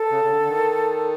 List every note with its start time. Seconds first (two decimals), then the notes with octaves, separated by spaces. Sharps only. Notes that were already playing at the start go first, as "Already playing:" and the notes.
Already playing: A4
0.11 C#3
0.24 C#3
0.30 D3
0.41 D3
0.49 D#3